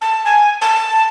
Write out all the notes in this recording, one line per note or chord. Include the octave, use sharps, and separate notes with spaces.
A5
G#5
A5